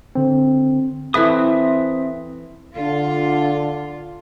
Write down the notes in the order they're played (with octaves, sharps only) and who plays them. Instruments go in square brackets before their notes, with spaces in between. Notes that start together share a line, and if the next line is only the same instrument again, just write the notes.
[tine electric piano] D3 C4
[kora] E3 A4 B4 [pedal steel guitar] C4 E5 D#6
[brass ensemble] D3 [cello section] F4